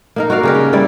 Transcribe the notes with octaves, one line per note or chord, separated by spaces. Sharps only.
A#3 D#4 A#4
F#4 A#4 D5 F5
C#3 G4 A#4
G5
G3 E4 D5